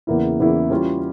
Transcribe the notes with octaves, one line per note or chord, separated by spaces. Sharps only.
E2 C#3 E3 A#3 E4
E2 C#3 E3 A#3 E4
E3 G3 C#4 F4